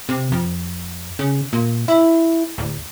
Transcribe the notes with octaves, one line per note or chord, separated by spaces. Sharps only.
C3
F2
C#3
A#2
E4
D1